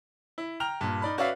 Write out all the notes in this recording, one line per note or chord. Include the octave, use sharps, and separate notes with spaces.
E4
G5 A#5 F6 F7
G2 A#2
D#4 D5 B5
C#4 F#4 B4 D5 E5 F5